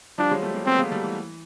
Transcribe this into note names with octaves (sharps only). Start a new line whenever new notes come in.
F3 G3 D4
F#3 G#3
G3 A3
G#3 A#3
A3 B3 C4
G#3 A#3
G3 A3
E3